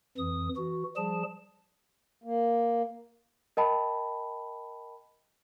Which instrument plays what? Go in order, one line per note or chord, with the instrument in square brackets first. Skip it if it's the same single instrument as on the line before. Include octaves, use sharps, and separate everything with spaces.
[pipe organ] F2 E3 D#6
E3 F#4
F3 G3 G#4 A5
[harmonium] A#3
[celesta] A#4 D#5 G5 A5 B5